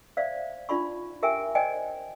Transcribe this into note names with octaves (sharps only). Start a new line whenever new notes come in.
C5 D5 E5 F5
D4 D#4 F4 D5 B5 C#6
G4 A#4 E5 G5 G#5
C5 D5 D#5 G5 G#5